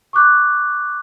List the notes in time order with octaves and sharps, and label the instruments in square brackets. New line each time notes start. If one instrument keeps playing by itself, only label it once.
[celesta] C#6 D6 F#6 G6